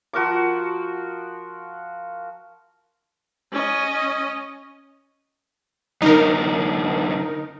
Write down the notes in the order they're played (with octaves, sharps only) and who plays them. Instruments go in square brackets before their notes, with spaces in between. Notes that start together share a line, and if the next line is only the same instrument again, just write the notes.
[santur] F3 F#4 A#4 D6
[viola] C#4 D#5
[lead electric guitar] F#2 D3 [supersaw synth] D#4 A#4